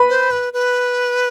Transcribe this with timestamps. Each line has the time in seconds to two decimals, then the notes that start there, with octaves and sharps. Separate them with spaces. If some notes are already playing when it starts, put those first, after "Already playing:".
Already playing: B4 B5
0.09 C5
0.31 B4
0.53 B4